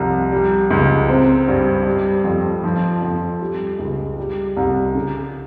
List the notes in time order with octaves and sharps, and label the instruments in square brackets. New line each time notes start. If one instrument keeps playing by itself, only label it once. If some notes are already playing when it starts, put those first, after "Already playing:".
Already playing: [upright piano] C2 F3
G3
C#2
C4
G2
G3
F2
F3
F2
G3
C#2
G3
C2
C#3